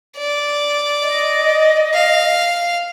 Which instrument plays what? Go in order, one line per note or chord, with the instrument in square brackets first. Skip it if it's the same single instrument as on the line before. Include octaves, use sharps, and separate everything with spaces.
[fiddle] D5
[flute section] D#5
[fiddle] F5